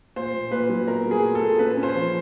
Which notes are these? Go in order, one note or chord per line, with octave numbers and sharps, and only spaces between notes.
A#2 C5
A#2
A#2 B4
F#3
B3 A#4
F#3
G#4
A#2
A4
A#2
C#4 B4
C#4
C5
F3